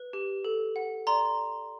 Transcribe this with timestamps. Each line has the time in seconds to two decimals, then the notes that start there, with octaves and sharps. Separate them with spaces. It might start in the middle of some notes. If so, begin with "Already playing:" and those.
Already playing: B4
0.13 G4
0.45 A4
0.76 F#5
1.07 D5 A#5 C6